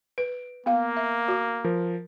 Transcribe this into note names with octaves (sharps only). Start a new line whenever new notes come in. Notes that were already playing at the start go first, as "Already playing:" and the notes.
B4 D7
A#3 B3 F5
E5
F#4
F3 A#4